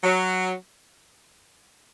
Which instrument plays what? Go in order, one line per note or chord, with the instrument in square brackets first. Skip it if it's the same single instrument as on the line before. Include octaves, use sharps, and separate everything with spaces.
[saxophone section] F#3